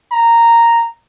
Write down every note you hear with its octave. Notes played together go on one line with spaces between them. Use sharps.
A#5